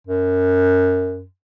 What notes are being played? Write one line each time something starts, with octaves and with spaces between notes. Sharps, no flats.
F#2